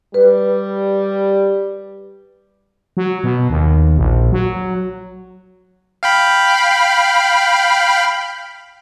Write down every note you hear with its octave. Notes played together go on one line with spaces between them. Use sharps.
G3 B4
F#3
B2
D#2
A#1
F#3
F5 G5 B5